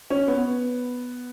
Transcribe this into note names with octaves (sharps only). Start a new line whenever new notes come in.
C#4
B3